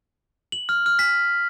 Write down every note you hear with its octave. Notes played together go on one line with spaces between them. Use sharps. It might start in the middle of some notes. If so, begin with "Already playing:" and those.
F#7
F6
F6
B6